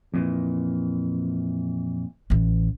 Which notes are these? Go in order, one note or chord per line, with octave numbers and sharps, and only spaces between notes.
F2 A#2 E3
A1 E3